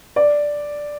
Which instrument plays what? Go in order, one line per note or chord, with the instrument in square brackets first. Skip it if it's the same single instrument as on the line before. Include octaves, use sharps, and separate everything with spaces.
[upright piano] D5